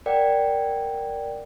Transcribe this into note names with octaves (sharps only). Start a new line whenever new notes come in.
A#4 D5 F#5 G5